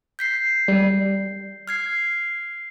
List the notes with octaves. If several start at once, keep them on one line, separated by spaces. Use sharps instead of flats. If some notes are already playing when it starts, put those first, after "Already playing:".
G6 B6 C7
G3
F6 G#6 C7